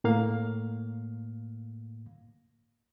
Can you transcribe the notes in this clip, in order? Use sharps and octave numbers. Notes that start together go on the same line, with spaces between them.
A2 A#3 F5